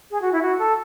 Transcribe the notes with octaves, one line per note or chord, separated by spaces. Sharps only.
G#4
F#4
E4
F#4
A4